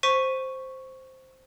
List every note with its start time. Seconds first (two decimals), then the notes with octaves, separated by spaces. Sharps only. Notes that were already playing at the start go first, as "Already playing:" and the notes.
0.03 C5 C#6 B6 D#7